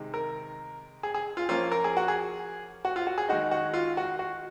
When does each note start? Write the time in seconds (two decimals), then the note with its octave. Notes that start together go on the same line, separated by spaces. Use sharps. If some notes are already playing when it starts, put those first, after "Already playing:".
Already playing: C3 D#3 G#3 D#4
0.14 A#4
1.03 G#4
1.14 G#4
1.37 F4
1.49 F3 A#3 C#4 F4
1.71 A#4
1.84 G#4
1.97 F#4
2.08 G#4
2.85 F#4
2.96 F4
3.07 F#4
3.18 G#4
3.29 D#3 G#3 D#4 F#4
3.51 F#4
3.74 F4
3.97 F#4
4.19 F#4